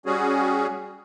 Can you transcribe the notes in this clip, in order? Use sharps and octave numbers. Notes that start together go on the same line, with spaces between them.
G3 C#4 F#4 G#4